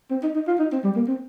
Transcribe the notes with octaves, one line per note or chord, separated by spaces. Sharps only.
C4
D#4
D#4
F4
D#4
C4
G3
A#3
C4